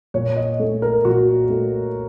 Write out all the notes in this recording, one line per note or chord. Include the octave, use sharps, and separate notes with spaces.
A#2 C#5
D#5
A3
A#4
A#2 F#4
A3